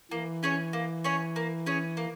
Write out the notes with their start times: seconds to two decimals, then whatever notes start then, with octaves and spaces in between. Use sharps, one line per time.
0.11 E3 A#3
0.43 C#4 G#4 C#5
0.73 A#3
1.04 C#4 G#4 C#5
1.36 A#3
1.66 C#4 G#4 C#5
1.97 A#3